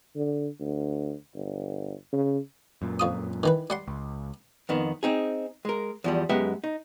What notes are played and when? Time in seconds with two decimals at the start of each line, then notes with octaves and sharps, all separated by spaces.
0.15 D3
0.60 D2
1.34 G1
2.13 C#3
2.82 F#2 A#2
3.00 F2 F4 D#6
3.43 D#3 E3 B4
3.70 G3 F#5 C6
3.88 C#2
4.69 F2 D#3 B3
5.03 C4 D#4 G#4
5.65 G#3 A#4
6.04 E2 F3 G3
6.29 F#2 G#3 B3 G4 E5
6.64 D#4